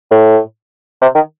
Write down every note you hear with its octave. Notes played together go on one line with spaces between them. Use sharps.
A2
C3
D#3